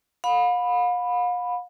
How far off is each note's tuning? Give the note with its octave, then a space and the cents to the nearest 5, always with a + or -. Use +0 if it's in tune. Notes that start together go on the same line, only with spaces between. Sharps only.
F5 +40 B5 +0